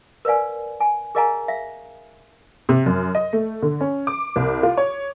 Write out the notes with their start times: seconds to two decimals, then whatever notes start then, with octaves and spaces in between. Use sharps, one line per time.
0.25 A#4 B4 D5 F5 G#5
0.80 G#5
1.15 G#4 A#4 D#5 F5 G#5 A#5
1.48 E5 F5
2.69 C3
2.86 F#2
3.15 D#5
3.33 A3
3.62 D3
3.81 C#4
4.07 D6
4.36 C2
4.63 F4
4.77 C#5